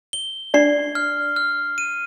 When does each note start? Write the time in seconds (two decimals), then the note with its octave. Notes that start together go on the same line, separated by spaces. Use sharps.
0.13 G7
0.54 D4 D5 C7
0.95 F6
1.36 F6
1.78 D#7